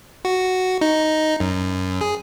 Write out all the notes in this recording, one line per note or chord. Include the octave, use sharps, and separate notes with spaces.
F#4
D#4
F#2
G#4